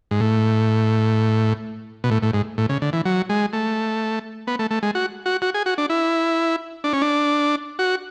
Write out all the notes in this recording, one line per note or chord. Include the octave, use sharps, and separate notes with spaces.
G#2
A2
B2
A2
A2
G#2
A2
C#3
D3
E3
F#3
G#3
A3
B3
A3
A3
G#3
F#4
F#4
F#4
G#4
F#4
D4
E4
D4
C#4
D4
F#4